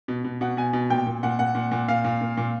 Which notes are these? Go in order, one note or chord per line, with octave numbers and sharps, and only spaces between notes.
B2
B2
B2 F#5
B2 G#5
B2
A#2 G5
A#2
A#2 F#5
A#2 F#5
A#2
A#2
A#2 F5
A#2
A#2
A#2